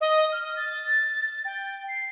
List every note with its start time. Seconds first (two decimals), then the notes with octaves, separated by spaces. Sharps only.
0.01 D#5
0.32 F6
0.56 A6
1.45 G5
1.88 C7